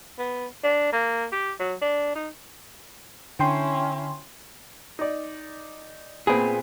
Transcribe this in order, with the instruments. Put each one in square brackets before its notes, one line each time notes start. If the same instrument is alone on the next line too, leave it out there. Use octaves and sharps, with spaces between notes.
[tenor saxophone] B3
D4
A#3
G4
F#3
D4
D#4
[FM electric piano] D3 G5 C6 [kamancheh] C#4 E4
[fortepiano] D#4 D5
[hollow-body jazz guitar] A#2 G#4 [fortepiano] B3 C4